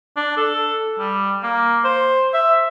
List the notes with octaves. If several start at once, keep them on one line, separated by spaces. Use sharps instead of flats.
D4
A4
G3
A#3
C5
E5